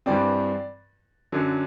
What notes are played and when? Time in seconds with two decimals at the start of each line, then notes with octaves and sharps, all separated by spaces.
0.06 G2 E3 G3 C4 D5
1.32 F#2 D3 F#3